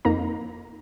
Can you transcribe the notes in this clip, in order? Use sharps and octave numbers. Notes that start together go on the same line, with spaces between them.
F2 A#3 D#4 A#5